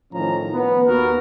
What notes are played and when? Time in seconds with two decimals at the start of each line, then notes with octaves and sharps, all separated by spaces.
0.13 A2 D#3 F3 C#4 A#5
0.53 B3
0.86 D#2 A#3 B3 F#4 A#4